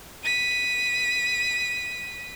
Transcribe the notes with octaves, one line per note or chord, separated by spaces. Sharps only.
B6 D#7